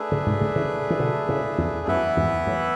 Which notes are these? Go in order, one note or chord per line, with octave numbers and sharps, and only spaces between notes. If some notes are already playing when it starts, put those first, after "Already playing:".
Already playing: A3 D4 G#4 B4 E5
A2 C#3
G#2 B2
A2 C#3
C#3 E3
E3
B2 D3
A2 C#3
E2
F#2 E3 B3 E4 B4 E5
E2 G#2
F#2 A2